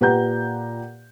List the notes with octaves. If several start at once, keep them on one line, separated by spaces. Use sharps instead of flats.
A#2 G4 B4 F#5 A#5 G6